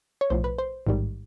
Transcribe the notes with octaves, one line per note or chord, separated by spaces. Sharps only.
C#5
B1 A2 F3 C5
B4
C5
A1 G#2 D#3 G3